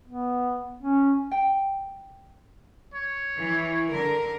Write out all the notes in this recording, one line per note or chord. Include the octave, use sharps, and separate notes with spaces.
B3
C#4
G5
C#5
E3
D3 A#4